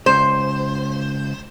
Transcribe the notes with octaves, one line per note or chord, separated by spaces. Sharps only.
C#2 C5